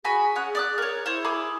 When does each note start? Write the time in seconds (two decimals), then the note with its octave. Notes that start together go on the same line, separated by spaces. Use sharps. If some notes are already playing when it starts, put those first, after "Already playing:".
0.05 F#4 G#4 G#5 B5
0.36 C#4 F#5 F#6
0.55 D5 D#6 F#6
0.78 A#4 C#5
1.06 E4 C5 C#5
1.25 G#4 B5 D6